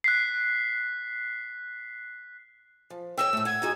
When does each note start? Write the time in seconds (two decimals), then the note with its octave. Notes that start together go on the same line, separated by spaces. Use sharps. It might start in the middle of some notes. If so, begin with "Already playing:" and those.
0.04 F#6 B6 C7
2.90 F3
3.17 C#5 D#5 G5 E6
3.33 A2 A3
3.45 F#5 G#6
3.62 D#4 F#4 G#4